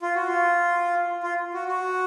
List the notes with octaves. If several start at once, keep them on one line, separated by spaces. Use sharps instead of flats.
F4
F#4
F4
F4
F#4
F#4